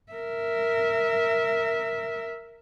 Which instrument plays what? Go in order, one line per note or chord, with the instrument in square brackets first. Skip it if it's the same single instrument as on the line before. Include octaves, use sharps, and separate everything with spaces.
[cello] A#4 E5